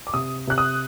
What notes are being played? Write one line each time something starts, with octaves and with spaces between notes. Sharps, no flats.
D6
C3 D#6
C3 F#6
D#6